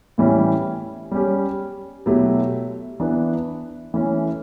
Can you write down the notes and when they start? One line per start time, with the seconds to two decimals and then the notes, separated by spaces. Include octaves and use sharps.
0.18 A2 E3 G3 C#4
1.12 G3 C#4 G4
2.06 B2 F#3 A3 E4 G4
3.00 E3 B3 D4
3.94 E3 A3 C#4